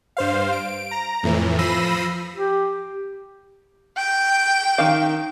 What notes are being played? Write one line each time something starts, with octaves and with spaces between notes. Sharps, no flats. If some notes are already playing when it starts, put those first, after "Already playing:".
G2 C5 F5
D7
A#5
F2 A2 E3
F3 B5 E6 A#6 C7 D#7
G4
G5
D#3 A#4 F5